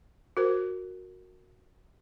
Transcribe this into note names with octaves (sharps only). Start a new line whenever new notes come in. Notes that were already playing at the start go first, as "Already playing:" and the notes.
F#4 A#4 C5